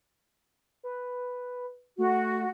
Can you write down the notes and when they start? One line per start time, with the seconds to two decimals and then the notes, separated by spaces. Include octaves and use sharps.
0.83 B4
1.98 A3 F#4